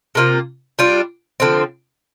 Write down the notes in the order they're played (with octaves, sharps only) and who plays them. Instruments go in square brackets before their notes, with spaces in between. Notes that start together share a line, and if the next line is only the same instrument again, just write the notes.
[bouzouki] C3 A#3 F4
G3 D4 F4
D3 F3 C4